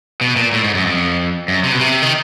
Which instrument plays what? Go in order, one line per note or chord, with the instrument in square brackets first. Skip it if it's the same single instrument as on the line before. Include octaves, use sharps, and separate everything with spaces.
[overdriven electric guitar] B2
A#2
A2
G#2
F#2
F2
F#2
C3
B2
C3
D#3